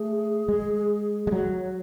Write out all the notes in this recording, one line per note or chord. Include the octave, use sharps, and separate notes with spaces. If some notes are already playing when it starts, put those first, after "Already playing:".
Already playing: A3 G#4
G#3
G#3
F#3